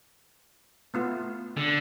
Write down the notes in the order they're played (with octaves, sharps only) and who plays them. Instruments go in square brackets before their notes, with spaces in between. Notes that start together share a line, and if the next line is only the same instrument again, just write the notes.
[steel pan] A3 B3 F4
[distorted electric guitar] D3